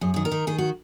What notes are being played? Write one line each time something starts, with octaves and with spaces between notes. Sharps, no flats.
F#2 G#4
D#3 G#4
A#4
D#3
D#3 G#4
F#4